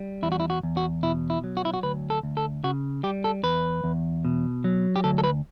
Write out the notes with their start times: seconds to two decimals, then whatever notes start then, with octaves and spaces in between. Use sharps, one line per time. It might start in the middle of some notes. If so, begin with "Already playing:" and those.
Already playing: G3
0.22 E2 E4
0.32 F#4
0.40 E4
0.50 F#4
0.63 E2
0.77 F#4
1.03 B2 E4
1.30 E4
1.44 F#3
1.57 F#4
1.65 E4
1.74 F#4
1.83 D2 B4
2.10 A4
2.23 D2
2.37 A4
2.64 C#3 F#4
3.03 G3 G4
3.24 A4
3.43 E2 B4
3.84 E2
4.25 B2
4.64 F#3
4.96 G4
5.04 D2 A4
5.18 A4
5.24 B4